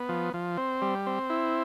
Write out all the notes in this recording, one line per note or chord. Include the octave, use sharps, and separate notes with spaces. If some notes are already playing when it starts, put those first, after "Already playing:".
Already playing: B3
F3
F3
C4
G3
C4
E4